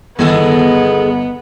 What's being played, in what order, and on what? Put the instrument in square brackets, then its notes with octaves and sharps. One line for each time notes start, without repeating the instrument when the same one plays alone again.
[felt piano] G1 [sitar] D#3 G#3 A4 [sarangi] B3